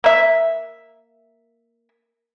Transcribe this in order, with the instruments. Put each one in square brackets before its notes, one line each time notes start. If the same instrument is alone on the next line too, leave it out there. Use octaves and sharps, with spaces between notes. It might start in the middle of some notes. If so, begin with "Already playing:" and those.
[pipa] A#3 E5